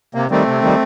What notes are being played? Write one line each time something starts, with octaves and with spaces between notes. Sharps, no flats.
C3 A#3
D#3 G3 A3 C4
C3
D#3 G3